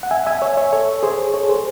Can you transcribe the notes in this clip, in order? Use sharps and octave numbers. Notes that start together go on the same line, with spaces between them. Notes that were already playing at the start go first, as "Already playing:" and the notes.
F#5
E5 G#5
E5 G#5
C#5 E5
C#5 E5
A4 C#5
G#4 C5
A4 C#5
G#4 C5